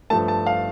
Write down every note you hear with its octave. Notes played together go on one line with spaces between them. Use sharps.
G2 F3 A3 A5
A5
F5